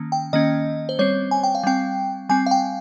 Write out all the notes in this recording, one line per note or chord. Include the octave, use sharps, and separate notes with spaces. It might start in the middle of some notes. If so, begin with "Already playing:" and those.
Already playing: D#3 A#3 C#4
G5
D#3 A#3 C#4 D#5
C5
G3 C4 C#5
G#5
G5
F5
G3 C4 G5
G3 C4 G#5
F5
G5